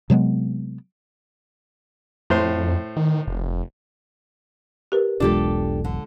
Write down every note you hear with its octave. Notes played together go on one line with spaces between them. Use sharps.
C3 F#3 G#3 B3
F2 A2 C5 C6
D#3
F1
G4 A#4 B4
E1 B1 E2 G#3 D4 F4 G4 A4
D3